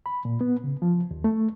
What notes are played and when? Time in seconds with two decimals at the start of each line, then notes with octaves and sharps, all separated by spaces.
0.06 B5
0.25 A#2
0.41 B3
0.64 C#3
0.82 F3
1.11 D#2
1.24 A3